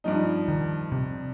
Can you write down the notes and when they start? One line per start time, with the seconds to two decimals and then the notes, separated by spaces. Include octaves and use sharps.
0.04 G2 F3 D#4
0.48 D#3
0.92 C3